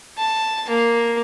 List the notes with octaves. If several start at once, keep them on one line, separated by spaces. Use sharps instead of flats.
A5
A#3